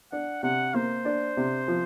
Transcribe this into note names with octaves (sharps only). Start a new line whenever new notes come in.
D4 F#5
C3 F#5
A#3 C5
D4
C3
F3